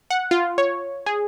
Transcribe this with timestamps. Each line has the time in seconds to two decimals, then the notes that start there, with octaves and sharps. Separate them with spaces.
0.10 F#5
0.31 F4
0.58 C#5
1.06 G#4